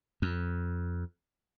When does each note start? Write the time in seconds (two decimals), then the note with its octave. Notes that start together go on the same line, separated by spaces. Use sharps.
0.22 F2